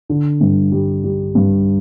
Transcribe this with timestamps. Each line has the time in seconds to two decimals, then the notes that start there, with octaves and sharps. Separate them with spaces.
0.09 D3
0.41 G2
0.72 G3
1.04 G3
1.35 G2